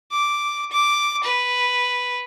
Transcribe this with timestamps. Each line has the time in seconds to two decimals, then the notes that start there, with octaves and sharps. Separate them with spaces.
0.12 D6
0.71 D6
1.24 B4